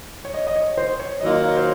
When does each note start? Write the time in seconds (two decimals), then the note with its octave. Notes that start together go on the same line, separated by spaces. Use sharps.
0.25 C#5
0.34 D#5
0.47 D#5
0.56 C#5
0.77 C5
1.00 C#5
1.21 D#3 F#3 A#3 F4 D#5
1.43 C#5
1.56 C5